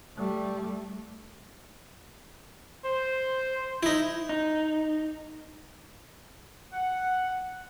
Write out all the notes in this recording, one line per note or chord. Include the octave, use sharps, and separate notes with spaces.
G3 A3
C5
D#4 E4
D#4
F#5